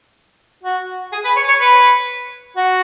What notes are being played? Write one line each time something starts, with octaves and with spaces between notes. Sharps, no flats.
F#4
G#4
B4
C#5
C#5
B4
F#4